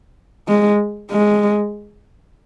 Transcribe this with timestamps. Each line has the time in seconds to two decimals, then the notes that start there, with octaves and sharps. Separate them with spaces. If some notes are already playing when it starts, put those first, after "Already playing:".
0.48 G#3
1.11 G#3